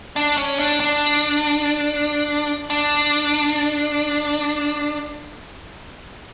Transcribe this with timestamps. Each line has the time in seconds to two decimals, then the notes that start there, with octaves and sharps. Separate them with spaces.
0.16 D4
0.38 C#4
0.59 D4
0.80 D4
2.70 D4